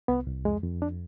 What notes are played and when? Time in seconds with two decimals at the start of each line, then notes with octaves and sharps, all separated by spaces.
0.08 C2 B3
0.27 C2
0.45 F2 G#3
0.63 F2
0.82 D4